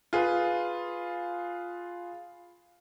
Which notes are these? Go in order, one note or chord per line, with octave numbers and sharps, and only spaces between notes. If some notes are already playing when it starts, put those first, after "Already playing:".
F4 G#4 B4